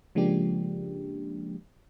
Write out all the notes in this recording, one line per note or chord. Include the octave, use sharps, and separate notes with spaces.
C#3 F3 G#3 A#3 D4 G4